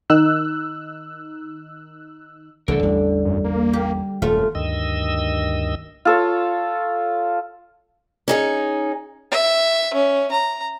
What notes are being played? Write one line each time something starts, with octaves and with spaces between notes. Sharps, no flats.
D#3 D#4 E6 F#6
C2 D3 E3 A3 A4 A#4
A1 E2 G3
F#2
A#3
G4
D#1 F#2 A3 F4
D2 G2 D#3 D#5 E6
F4 A4 C#5
C#4 D#4 G#4
E5
C#4
A#5